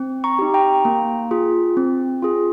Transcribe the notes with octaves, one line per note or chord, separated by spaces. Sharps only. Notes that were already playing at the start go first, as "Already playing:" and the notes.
Already playing: C4
A#5 C#6
D#4 G4
G5 A#5
A#3
F4 G#4
C4
F4 G#4